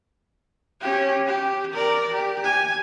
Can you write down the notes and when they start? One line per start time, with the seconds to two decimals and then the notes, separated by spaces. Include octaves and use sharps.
0.81 C#4 G4
1.27 G4
1.74 A#4 D5
2.14 G4
2.44 G#5